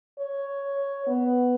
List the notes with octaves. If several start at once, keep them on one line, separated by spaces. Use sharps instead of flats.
C#5
B3